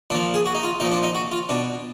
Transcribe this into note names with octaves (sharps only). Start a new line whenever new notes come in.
A#2 F3 D4
G#4
F#4
D#4
F4
A#2 F3 D#4
D4
D#4
F#4
F4
B2 D4